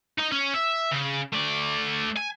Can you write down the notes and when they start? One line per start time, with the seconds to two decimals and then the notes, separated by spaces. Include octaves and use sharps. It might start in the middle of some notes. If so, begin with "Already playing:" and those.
0.18 D#4 D#5
0.32 C#4
0.54 E5
0.91 C#3
1.33 A3 D5
2.17 G#5